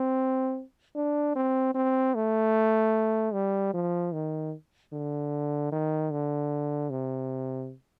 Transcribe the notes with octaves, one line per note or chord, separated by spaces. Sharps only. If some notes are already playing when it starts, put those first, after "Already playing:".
Already playing: C4
D4
C4
C4
A3
G3
F3
D#3
D3
D#3
D3
C3